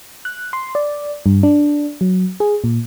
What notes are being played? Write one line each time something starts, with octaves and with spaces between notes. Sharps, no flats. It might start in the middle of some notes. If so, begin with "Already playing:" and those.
F#6
C6
D5
G2
D4
F#3
G#4
A#2